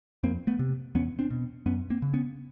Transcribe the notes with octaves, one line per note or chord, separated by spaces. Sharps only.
F2 A#3 C4
A3 B3
C3
E2 B3 C#4
C4 D4
B2
F#2 B3 C#4
A#3 C4
C#3
B3 C#4